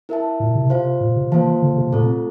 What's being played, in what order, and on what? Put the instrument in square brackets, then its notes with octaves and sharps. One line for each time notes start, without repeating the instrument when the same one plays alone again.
[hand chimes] E4 A#4 E5 A5
[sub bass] A#2
C3
[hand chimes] F4 C5 F5
[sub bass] A#2
C3
[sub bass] E3 [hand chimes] A#3 F4 C5 F5 A5
[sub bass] D3
D3
C3
[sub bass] A#2 [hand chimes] A3 C4 F4 A4